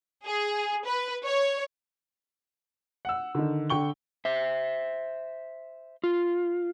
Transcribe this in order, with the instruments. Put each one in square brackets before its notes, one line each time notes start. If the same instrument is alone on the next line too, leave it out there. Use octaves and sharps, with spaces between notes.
[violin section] G#4
B4
C#5
[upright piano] F#5 E6
D3 D#3
D3 G5 C#6 G7
[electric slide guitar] C5 E5
F4